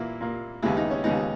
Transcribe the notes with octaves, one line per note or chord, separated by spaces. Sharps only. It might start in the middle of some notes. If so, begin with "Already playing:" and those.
Already playing: A#2 E3 A#3 E4
A#2 A#3
D#2 C#3 E3 G#3 B3 E4
D#4
C#4
D#2 C#3 G#3 B3 D#4